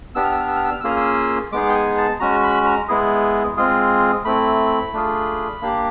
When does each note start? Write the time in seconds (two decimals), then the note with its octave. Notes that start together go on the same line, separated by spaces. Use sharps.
0.15 B3 D4 G4 E6
0.24 F6
0.32 E6
0.40 F6
0.48 E6
0.56 F6
0.64 E6
0.72 F6
0.80 E6
0.84 A#3 C#4 F4 G#4 F6
0.97 E6
1.52 G#3 B3 D#4 G#4 D6
1.69 G5
1.75 G#5
1.98 A5
2.20 G#3 C#4 F#4 A#5
2.43 B5
2.66 A#5
2.89 G#3 B3 E4 G#4
3.57 G#3 C4 F4 G#4
4.25 A3 C4 E4 B5
4.93 A3 D4 F4 G#4
5.61 A#3 D4 G4